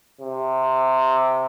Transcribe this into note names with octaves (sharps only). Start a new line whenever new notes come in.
C3